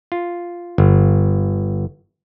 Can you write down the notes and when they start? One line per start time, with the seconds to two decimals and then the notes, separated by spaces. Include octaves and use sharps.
0.12 F4
0.78 G1